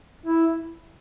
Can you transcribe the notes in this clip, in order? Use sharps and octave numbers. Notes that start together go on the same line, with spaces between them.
E4